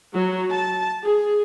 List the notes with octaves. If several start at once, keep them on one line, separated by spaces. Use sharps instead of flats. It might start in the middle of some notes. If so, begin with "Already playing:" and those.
F#3
A5
G#4